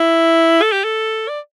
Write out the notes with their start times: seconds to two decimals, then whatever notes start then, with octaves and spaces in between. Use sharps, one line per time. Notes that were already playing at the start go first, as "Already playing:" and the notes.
Already playing: E4
0.62 A4
0.72 G4
0.84 A4
1.29 D5